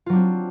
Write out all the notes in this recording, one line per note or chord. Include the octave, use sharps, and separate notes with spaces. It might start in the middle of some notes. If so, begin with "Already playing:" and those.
F#3 C4 D4 F4